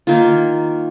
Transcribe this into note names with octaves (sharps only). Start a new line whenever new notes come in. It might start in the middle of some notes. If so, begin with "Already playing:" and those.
D#3 A#3 F4